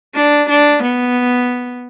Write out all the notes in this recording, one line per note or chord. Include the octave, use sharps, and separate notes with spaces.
D4
D4
B3